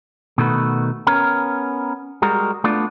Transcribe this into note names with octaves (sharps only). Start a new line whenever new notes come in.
B2 D#3 A3 F#4 B4
B3 C#4 A#4
G3 G#3 F#4 A#4
A3 B3 D4 F4 D5